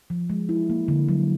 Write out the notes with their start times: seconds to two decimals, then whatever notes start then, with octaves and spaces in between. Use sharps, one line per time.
0.10 F3
0.30 G#3
0.49 E4
0.70 A#3
0.88 D3
1.09 F#3